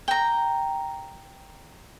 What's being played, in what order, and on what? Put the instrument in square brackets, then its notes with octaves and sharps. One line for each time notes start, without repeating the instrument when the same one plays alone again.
[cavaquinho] G5 A#5